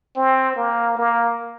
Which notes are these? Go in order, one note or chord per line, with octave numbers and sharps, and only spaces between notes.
C4
A#3
A#3